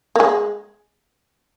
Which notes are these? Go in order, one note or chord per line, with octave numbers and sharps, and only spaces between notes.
A#3
G#3